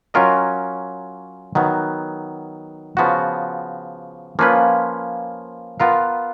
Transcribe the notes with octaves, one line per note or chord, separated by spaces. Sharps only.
F#3 C#4 F4 A#4 D#5
D#3 F#3 B3
C#3 F3 B3 F#4
F3 A#3 C#4 F4 B4
B3 F4 A#4 F5